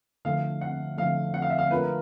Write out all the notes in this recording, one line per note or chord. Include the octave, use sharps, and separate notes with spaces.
D3 F3 A3 F5
F#5
D3 F3 A3 F5
F#5
F5
E5
F5
A3 D4 F4 A#4 B4